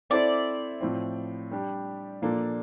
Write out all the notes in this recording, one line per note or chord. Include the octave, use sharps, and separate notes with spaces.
C4 E4 A4 C5 D5 E5
A2 F3 C4
G3 D4 G4
A#2 F3 A#3 D4 A4